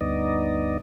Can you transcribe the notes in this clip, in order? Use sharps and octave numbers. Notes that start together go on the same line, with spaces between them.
D2 G2 B3 D#4 D5 D#5